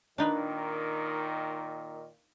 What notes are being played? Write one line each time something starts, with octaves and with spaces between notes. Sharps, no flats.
A#2 D#3 D4 D#4 B4